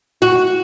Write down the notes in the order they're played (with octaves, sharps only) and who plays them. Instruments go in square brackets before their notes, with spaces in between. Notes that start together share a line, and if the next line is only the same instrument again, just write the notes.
[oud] F#4